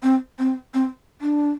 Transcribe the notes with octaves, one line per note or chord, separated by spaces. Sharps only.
C4
C4
C4
D4